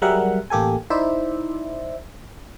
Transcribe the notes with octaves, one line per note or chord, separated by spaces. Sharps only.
F#3 G3 G#4 A#4 E5 F#5
A1 A#3 G4 A4 G#5
D#4 E4 C5 D5 E5